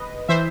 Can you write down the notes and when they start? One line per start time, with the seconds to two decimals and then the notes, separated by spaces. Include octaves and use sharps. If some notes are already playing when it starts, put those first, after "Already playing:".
Already playing: B4 D#5
0.29 E3 C5 E5